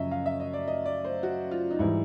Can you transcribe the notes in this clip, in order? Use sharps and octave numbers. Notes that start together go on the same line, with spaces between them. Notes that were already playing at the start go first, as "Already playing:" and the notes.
Already playing: F#2 C#3 F3 D#5 E5
F5
E5
D#5
D5
D#5
D5
C5
F#4
F4
D#4
G#2 E3 G3 E4